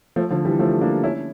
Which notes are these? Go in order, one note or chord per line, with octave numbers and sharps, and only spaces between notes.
F3 A3
D3 F3
E3 G3
F3 A3
A#3 D4
C#4 E4